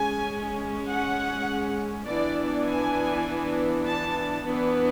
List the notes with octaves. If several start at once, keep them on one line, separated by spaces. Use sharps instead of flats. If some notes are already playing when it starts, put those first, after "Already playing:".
Already playing: G#3 C#4 G#5
F#5
E3 B3 D4 D5
G#5
A5
E3 B3 D4